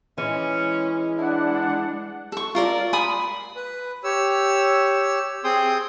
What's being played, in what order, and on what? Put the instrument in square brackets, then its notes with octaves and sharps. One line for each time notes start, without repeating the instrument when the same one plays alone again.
[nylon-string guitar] E3 [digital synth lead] G#3 [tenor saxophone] C#4
[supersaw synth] D4 F#5 [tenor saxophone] E4
[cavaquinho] A4 C#6
F4 A#4 D5
G#5 B5 C6 D#6
[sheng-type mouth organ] B4
G4 C#5 E6
C4 G#4 G5 C6 D#6